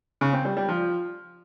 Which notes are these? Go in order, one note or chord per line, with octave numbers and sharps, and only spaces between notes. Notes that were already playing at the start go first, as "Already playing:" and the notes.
C#3
C4
G3
G3
F3